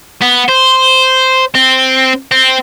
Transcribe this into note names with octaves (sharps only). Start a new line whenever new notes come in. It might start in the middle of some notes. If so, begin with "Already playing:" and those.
B3
C5
C4
C4